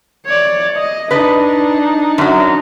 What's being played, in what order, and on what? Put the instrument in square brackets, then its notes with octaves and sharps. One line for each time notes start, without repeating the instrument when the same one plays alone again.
[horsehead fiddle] C#5 D5
D#5
[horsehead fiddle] D4 D#4 [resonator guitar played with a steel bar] B4 D#5
[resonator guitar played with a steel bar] F#2 F#3